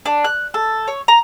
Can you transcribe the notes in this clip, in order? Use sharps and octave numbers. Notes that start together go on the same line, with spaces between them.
D4
F#6
A4
C#5
A#5